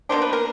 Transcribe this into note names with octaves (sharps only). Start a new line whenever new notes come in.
B2 G3 A#3 D4 C5
B4
A#4